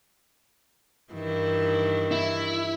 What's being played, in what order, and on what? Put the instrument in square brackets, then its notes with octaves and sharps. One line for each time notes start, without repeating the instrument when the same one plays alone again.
[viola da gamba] G2 D#3 E3
[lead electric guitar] E4